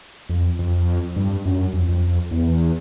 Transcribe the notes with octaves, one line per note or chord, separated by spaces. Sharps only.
F2
F2
G2
F#2
F2
F2
E2